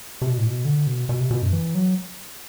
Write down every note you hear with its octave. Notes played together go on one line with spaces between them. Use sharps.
C3
B2
A2
B2
D3
B2
B2
C3
B2
F#2
E3
F#3